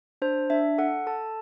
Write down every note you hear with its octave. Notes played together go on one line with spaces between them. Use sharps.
D4 C5
D4 E5
A4 F#5
A4 A5